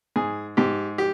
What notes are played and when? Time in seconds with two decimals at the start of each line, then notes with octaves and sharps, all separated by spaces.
0.16 G#2 G#4
0.57 G#2 G4
0.98 G4